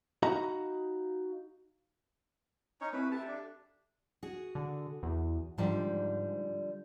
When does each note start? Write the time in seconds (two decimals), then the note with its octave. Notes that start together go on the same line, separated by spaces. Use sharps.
0.23 D#4 F#4 D#5 F5 A#5 B5
2.81 C#4 D#4 C#5
2.93 C4 E4 B4
3.11 G4 A4 E5 A5
3.27 D4
4.23 F#4 G#4
4.55 D3
5.03 E2
5.58 G#2 D3 F3 G3